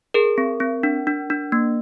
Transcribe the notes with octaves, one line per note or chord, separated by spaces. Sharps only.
G#4 A#4
C4
C4
D4
D4
D4
A#3